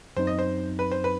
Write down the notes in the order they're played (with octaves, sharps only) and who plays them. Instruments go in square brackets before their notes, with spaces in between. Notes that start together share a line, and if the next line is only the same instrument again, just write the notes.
[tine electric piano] F#2 F#3 C4 D#4 [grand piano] C5
[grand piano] D#5
C5
B4
C5
B4